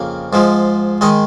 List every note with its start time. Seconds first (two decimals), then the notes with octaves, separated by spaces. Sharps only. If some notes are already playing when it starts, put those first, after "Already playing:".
Already playing: F2 C#3 A#3
0.33 G#2 F3 G#3
1.01 D#3 G#3 D#5